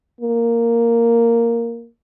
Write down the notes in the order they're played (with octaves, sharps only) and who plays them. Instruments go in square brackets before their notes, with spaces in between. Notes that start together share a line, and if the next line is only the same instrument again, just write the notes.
[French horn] A#3